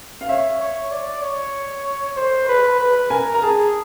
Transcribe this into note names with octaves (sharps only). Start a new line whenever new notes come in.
F5
C#5 E5
C#5
D5
C#5
C5
B4
B4
A#4 G#5
A#5
G#4 A5